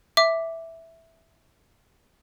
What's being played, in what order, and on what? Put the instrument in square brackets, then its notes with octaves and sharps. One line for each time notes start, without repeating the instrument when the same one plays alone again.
[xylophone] E5 D6